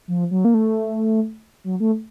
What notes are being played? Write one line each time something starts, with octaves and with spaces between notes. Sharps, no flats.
F3
F#3
A#3
A3
F#3
A3